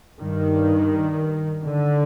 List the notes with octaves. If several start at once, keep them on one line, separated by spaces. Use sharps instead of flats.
G2 D#3
D3